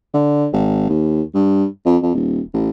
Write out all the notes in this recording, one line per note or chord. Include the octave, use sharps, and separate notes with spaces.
D3
G#1
D#2
G2
F2
F2
D#1
A1